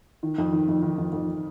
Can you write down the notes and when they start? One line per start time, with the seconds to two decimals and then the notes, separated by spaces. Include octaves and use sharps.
0.23 D#3
0.38 F2
0.52 D#3
0.68 F2
0.82 D#3
0.98 F2
1.13 F2